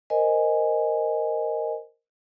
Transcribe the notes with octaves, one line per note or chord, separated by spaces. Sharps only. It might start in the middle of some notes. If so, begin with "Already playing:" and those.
A#4 C5 D#5 G#5